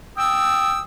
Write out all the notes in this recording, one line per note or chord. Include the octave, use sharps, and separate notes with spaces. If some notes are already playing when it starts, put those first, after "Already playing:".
G5 D#6 E6